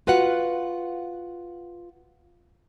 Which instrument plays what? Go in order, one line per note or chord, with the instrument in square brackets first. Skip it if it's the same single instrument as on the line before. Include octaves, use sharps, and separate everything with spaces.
[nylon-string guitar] F4 F#4 B4 F5 F#5